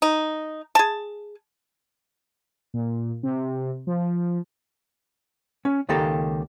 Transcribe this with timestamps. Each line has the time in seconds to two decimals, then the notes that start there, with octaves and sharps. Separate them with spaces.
0.02 D#4
0.75 G#4 A5
2.74 A#2
3.23 C3
3.87 F3
5.65 C#4
5.89 C#2 D#3 A#3 G4 A4 A#5